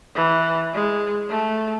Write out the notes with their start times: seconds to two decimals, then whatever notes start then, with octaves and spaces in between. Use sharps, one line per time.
0.15 E3
0.74 G#3
1.30 A3